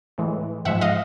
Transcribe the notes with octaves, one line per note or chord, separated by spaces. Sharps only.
A2 E3 G#3
G#2 F3 G#3 E5 F#5
D#5 F5